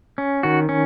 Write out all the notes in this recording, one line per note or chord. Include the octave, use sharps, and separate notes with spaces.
C#4
D#3 F#4
C#4